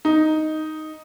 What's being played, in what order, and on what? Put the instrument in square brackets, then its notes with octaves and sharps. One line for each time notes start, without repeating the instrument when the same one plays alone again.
[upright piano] D#4